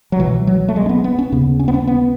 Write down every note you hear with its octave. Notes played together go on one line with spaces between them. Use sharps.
F#3
C#2 B2 E3
F#3
A3
G#3
C#4
B3
B3
C#4
D#2 C#3 B3
C#4
B3
C#4
B3